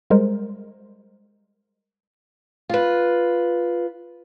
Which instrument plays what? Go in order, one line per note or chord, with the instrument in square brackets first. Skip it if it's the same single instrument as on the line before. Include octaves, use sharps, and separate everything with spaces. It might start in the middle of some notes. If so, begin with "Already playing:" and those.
[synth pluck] G3 G#3 A#4 C5
[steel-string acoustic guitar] F4 B4